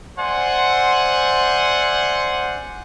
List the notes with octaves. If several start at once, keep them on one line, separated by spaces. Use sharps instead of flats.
C5 D5 E5 F#5 G#5 C6